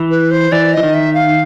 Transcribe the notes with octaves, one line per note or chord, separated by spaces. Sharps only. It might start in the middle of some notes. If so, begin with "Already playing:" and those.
Already playing: E3
B4
C5
E3 D5
E3 D#5
D#3
E5
F5